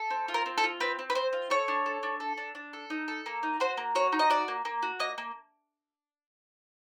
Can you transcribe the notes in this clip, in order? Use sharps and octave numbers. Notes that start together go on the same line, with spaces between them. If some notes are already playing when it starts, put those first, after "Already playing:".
Already playing: A4
C4
F4
A#4
C4
A4
F4
C4 B4
C4
B4
C4 C5
F4
A4 C#5
D4
A4
D4
A4
D4
D4
A4
D#4
A4
A#3
D#4
F#4 C5
A#3
F#4 C#5
D#4
D#5
F#4 D5
A#3
A#3
F#4
A#3 D#5
A#3